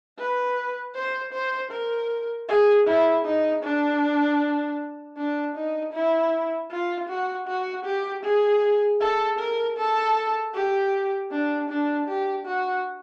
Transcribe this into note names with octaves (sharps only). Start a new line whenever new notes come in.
B4
C5
C5
A#4
G#4
E4
D#4
D4
D4
D#4
E4
F4
F#4
F#4
G4
G#4
A4
A#4
A4
G4
D4
D4
G4
F#4